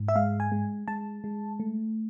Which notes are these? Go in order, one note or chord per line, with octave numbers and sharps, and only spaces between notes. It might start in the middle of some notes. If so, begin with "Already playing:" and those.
Already playing: G#2
E5
G#3 F5
G#5
G#3
G#3 A5
G#3
A3